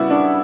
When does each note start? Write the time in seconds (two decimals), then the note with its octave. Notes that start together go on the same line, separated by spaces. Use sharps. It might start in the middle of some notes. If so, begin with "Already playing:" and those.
Already playing: C#3 G3 B3 E4 F#4
0.10 D4